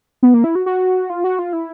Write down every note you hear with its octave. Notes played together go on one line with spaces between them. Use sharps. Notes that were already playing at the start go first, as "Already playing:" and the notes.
B3
A#3
E4
F#4
F#4
F4
F#4
F4
E4